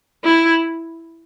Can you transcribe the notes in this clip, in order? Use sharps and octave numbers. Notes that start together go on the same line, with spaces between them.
E4